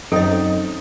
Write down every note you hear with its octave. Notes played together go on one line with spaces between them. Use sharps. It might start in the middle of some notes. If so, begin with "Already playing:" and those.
F#2 F#3 C4 D#4 A4 D#5